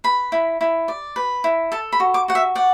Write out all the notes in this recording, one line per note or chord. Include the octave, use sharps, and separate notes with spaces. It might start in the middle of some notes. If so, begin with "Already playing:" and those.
B4 B5
E4
E4
D5
B4
E4
A4 A5
B5
F#4
D6
F#4 F#5
E5
D5 F#5